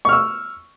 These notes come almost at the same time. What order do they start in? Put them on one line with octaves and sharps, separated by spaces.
C#6 F6 E6